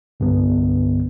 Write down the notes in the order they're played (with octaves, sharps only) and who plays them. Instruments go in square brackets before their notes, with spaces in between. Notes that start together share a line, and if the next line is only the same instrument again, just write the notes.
[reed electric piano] C2 G2 D3 B3